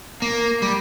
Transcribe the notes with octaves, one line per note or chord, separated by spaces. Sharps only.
A#3
G3